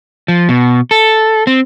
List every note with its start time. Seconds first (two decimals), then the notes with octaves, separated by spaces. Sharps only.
0.28 F3
0.49 B2
0.91 A4
1.47 C4